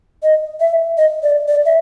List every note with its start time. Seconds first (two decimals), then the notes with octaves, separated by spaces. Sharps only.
0.23 D#5
0.60 E5
0.98 D#5
1.23 D5
1.48 D5
1.66 E5